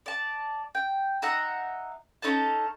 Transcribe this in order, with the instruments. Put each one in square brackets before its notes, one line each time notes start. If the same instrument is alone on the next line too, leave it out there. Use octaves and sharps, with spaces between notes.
[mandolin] D5 A5
G5
D#4 E5 F#5 A#5
C#4 D#4 A4 A5